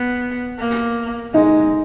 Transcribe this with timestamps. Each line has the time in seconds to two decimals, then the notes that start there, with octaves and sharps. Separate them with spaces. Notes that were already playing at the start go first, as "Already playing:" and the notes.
Already playing: B3
0.58 A#3
1.34 G#3 D#4